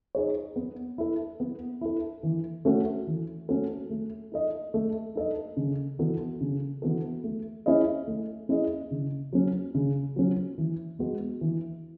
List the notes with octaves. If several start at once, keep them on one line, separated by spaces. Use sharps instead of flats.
D#4 G#4 C#5
B3
E4 A4
B3
E4 A4
E3
A3 C#4 F#4 A4
E3
A3 C#4 F#4 A4
A3
D#4 A4 D#5
A3
D#4 A4 D#5
C#3
E3 B3 F#4 A4
C#3
E3 B3 F#4 A4
A3
C#4 E4 G#4 D#5
A3
C#4 E4 G#4 D#5
C#3
F#3 C#4
C#3
F#3 C#4
E3
G#3 B3 F#4
E3